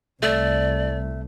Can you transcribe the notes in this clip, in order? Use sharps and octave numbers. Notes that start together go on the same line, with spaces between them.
C2 A3 D5